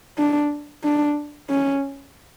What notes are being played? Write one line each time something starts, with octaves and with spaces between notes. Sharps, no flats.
D4
D4
C#4